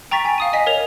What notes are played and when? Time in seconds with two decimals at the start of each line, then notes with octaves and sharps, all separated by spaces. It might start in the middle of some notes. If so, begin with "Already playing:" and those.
0.11 G5 A#5 C#6 A6 B6
0.24 G5 G#5
0.38 F5 D#6 D#7
0.53 D#5 G#5 B6
0.67 A#4 C#5 F7